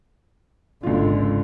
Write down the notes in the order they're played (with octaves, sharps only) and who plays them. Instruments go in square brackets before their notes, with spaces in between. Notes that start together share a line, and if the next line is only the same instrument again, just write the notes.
[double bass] G#1 D3 [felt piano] C#2 F4